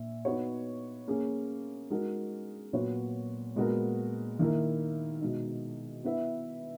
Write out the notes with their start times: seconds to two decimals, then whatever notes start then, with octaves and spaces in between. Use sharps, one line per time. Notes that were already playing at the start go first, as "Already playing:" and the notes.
Already playing: A#2 E5
0.25 B3 D#4 F#4 C#5
1.08 A#3 C#4 G#4
1.90 G#3 D#4 F#4 A#4
2.73 A#2 F#3 B3 F#4 C#5
3.56 A#2 G#3 B3 F#4 A#4
4.39 D#3 A#3 E4 A#4
5.21 B2 G#3 D#4
6.04 B3 E4 B4 E5